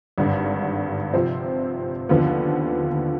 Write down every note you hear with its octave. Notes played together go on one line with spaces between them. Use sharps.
G#1 G2 D3
C3 F3 C4
D#2 D3 F3 B3 F4